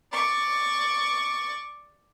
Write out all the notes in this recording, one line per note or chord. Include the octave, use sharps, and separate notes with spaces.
D5 C#6